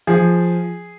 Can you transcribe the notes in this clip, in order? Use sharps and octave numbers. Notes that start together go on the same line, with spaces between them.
F3 G#4